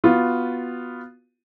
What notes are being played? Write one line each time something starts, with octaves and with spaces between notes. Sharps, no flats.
B3 F4 F#4